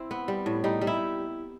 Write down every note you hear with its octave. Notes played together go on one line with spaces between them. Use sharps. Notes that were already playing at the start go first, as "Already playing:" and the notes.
Already playing: C4 E4
B3
G3
A2
G3 D#4
G3
E4